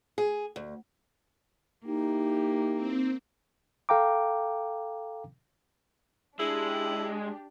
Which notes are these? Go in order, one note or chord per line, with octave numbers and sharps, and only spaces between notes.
G#4
D2
A#3 D#4 E4 G4
C4
A4 F5 G5 A#5 D6
G#3 D4 E4 G4